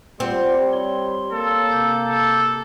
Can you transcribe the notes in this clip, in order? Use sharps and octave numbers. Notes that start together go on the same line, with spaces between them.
G3 C4 F4 G4 F#5
C#5 C6
A#3 A4
C3 D6 G6
A4